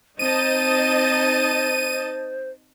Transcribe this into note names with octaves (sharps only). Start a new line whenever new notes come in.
C4 D#4 C5 D#5 A5 D#7